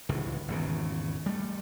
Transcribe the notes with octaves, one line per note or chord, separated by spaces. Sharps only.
G1 C#2 A2 E3
G#1 E2 C#3
G3 A3